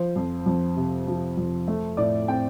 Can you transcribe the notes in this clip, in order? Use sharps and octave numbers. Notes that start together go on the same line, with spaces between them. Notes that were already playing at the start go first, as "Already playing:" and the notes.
Already playing: F3 C5
F2
F2
C3
F3
F2
A3
A2 D5
C4 G5